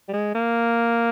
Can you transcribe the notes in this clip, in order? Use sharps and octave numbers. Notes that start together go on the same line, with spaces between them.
G3
G#3
A#3